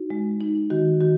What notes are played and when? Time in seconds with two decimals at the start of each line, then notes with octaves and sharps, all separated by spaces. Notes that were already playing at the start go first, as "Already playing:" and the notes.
Already playing: D#4 F#4
0.10 G#3
0.41 D#4
0.70 D#3 F#4
1.01 D#3 F#4